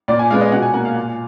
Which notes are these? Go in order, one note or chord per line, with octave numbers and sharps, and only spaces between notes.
A#2 D5
G#5
G#3 B3 F5
D#5
B2 F#5
G#5
A#3 F#5
F5
A#2